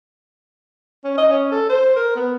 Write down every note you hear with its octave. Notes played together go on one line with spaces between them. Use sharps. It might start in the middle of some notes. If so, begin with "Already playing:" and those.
C#4
D#5
C#4
A4
C5
A#4
B3